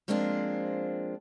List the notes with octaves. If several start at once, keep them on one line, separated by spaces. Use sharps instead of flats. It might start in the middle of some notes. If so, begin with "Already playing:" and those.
F3 G#3 A#3 C4 D4 F4